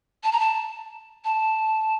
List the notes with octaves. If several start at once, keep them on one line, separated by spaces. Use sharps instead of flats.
A5
A#5
A5
A5